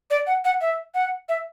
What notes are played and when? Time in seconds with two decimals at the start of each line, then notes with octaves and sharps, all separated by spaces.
0.11 D5
0.27 F#5
0.45 F#5
0.61 E5
0.95 F#5
1.29 E5